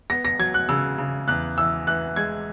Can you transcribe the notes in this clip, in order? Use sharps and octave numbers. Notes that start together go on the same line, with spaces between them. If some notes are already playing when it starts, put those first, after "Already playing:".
B3 A#6
A#6
F#3 G#6
F#6
C#3 E6
C#3
E2 F#6
E3 E6
E3 F#6
G#3 G#6